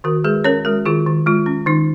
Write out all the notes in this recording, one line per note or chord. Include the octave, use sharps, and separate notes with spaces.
D#3 F#4 A#4
G#3 G#4 B4
C#4 A#4 C#5
G#3 F#4 A#4
D#3 F4 G#4
D#3
G#3 F4
C#4
D#3 D#4